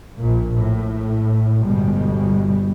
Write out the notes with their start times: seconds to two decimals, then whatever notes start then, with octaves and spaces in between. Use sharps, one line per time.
0.18 A#1 A#2
0.56 A2
1.62 G1 B2 G3 G#3